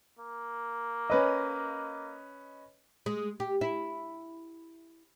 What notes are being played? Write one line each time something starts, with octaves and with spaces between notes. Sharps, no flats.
A#3
C#4 B4 D#5
G#3
G4
E4